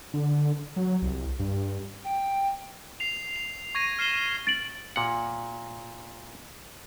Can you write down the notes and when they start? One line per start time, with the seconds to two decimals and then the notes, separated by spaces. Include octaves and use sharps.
0.14 D3
0.76 F#3
1.02 C2
1.39 G2
2.04 G5
3.00 C7 F7
3.36 F7
3.75 C#6 G#6 A#6 D#7
3.99 F6 C7 E7 G7
4.47 A6 D7 F#7
4.96 A#2 F#5